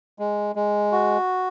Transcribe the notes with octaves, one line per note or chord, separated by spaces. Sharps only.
G#3
G#3
F#4